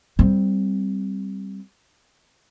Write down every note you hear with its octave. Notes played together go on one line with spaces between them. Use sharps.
G3 C4